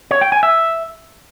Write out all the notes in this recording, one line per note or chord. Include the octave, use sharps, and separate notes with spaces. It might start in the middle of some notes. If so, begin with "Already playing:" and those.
C#5
G5
G#5
E5